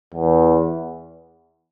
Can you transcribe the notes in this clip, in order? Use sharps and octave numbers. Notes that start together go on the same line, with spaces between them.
E2